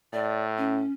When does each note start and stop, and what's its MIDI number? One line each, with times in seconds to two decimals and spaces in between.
0.13 0.83 45
0.13 0.43 74
0.58 0.92 61